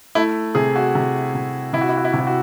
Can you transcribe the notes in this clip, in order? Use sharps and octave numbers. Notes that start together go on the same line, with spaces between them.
A3 E4
C3 G#4
F#4
C3
C3
C3 E4
F#4
E4
F#4
E4
C3 F#4
E4
F#4